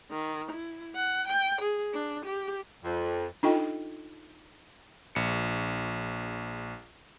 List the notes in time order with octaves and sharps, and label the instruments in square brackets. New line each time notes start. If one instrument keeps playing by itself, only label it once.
[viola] D#3
E4
F#5
G5
G#4
D4
G4
[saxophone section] F2
[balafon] D4 D#4 F4 A4 D#5 G5
[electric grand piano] A#1 C#7